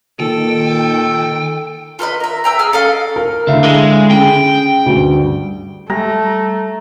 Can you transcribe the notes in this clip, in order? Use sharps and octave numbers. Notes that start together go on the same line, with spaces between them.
A#2 D#3 A4 G5
F4 A4 B4 D#5
A#4 E5
B4 E5 G5 A#5
G#4 E6 F6
C#4 A4 D#5 F5
A#4
D3 A3 E4 A4 E5 F5
G#3
C#4 G#4 G5
D2 G2
G3 A3 A#5